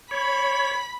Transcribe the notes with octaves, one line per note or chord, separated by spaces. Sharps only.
C#5 B5